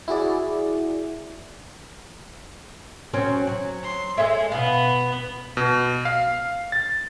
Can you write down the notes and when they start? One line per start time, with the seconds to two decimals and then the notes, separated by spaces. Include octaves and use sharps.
0.08 E4 F#4 G#4 D5
3.13 F#3 C4 C#4
3.47 F#3
3.83 C6
4.18 G#3 A4 C#5 E5
4.52 B2 B3 F5
5.57 B2
6.05 F5
6.72 A6